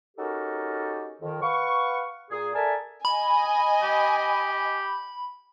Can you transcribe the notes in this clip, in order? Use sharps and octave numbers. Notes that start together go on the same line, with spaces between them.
C#4 D#4 F#4 G4 A4 A#4
F2 D#3
B4 F5 F#5 C#6
A#2 G#4
A4 A#4 D5 E5 G#5 A5
D#5 G#5 B5
G4